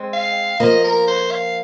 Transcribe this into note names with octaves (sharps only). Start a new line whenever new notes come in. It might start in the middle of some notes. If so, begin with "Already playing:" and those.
Already playing: G#3 C4
F5
F3 A#3 D#5
A#4
C5
F5